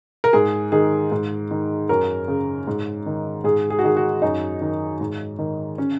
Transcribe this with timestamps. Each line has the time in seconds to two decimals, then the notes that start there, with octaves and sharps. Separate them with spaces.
0.24 A#4
0.33 G#2 G#4
0.72 D#3 G#4
1.12 G#2
1.51 D#3
1.89 F#2 A#4
2.28 C#3
2.67 G#2
3.06 D#3
3.44 G#2 G#4
3.70 G#4
3.79 F#4
3.84 D#3 G#4
3.97 F#4
4.22 F#2 D#4
4.61 D#3
5.01 G#2
5.39 D#3
5.78 C#4